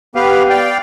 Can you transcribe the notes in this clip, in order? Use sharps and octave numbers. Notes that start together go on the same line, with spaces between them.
B3 G4 B4 F5
D5 F5 G5